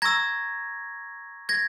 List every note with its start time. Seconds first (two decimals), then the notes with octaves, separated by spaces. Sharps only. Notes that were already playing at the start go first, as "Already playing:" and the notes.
0.02 A#5 C#6 E6 G#6 A#6
1.49 G#6 A#6